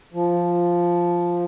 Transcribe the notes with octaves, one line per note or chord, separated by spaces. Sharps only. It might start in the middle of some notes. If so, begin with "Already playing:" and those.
F3